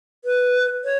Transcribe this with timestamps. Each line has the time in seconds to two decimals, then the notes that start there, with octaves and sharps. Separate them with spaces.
0.25 B4
0.84 C#5